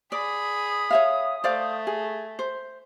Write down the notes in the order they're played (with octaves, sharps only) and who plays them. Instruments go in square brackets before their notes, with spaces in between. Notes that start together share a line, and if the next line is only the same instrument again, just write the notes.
[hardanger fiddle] G#4 B5 [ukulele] D5 [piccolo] D#6
[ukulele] C#5 E5 F5
[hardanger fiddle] A3 [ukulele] C5 D5 F5
[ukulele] G#4
C5